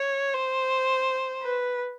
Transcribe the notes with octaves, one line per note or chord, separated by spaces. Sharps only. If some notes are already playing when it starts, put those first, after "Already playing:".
Already playing: C#5
C5
B4